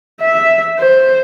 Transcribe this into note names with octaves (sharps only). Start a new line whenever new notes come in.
E5
C5